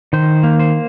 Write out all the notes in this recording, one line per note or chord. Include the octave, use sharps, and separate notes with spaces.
D#3 C5
A#3
C5